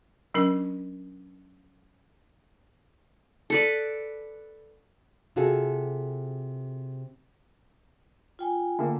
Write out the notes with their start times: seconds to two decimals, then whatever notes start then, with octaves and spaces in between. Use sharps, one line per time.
0.34 F#3 C#4 D4 A#4
3.50 A4 B4 D5
5.36 C3 F4 F#4 G#4 A4
8.39 F4 G5 G#5
8.79 D3 A#3